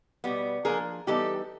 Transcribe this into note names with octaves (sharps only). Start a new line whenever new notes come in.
B2 G3 B3
F3 A#3 D4 G#4 A#4
E3 G3 B3 D#4 G4 A4